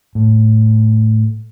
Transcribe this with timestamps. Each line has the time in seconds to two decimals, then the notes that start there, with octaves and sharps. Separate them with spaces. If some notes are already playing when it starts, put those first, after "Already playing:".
0.15 A2